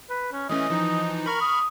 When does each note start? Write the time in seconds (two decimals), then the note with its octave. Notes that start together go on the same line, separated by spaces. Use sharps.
0.10 B4
0.32 C#4
0.50 E3 A3 C#4 D#5
0.69 E3 F3 D#4
1.26 A#4 B5 C#6 F6
1.41 D#6